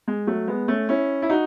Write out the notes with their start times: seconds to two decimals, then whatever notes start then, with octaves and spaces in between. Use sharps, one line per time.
0.08 G#3
0.27 F#3 A3
0.48 G#3 B3
0.68 A3 C#4
0.89 C#4 E4
1.22 E4
1.30 D#4 F#4